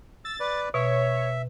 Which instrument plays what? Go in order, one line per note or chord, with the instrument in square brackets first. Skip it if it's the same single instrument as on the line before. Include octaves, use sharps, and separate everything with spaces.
[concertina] E6 [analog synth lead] A6
[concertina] B4 D5
[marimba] B2 [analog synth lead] C#5 [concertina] E5